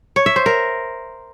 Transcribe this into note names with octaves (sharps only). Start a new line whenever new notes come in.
C#5
E5
C5
A#4